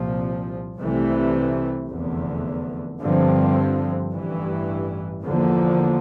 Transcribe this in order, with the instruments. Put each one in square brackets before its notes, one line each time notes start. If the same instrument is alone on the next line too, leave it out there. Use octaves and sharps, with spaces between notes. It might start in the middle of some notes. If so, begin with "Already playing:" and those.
Already playing: [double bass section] C2 A#2 F3
C2 C3 E3 A3
F1 E2 D3
G2 D3 F3 C4
A1 G2 E3
E2 D3 F3 A#3